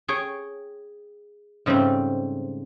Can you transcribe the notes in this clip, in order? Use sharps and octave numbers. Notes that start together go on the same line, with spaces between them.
G#4 C#5 G5
G#2 C#3 G3 A3 C4